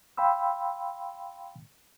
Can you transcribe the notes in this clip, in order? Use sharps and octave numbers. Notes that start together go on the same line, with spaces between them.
F5 G5 B5 C6 E6